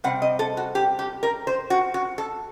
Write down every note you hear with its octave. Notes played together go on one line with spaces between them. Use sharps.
C3 G3 C4 F#5
D#5
A4
F#4
G4
G4
A#4
C5
F#4
F#4
A4